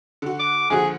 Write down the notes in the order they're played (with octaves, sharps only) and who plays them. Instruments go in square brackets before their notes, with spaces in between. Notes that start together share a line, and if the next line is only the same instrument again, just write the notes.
[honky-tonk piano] D3 F#4
[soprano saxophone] D6
[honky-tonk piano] A#1 D3 F#4 [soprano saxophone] G#4